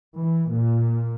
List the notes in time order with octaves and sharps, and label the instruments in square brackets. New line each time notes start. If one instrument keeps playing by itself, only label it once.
[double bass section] E3
A#2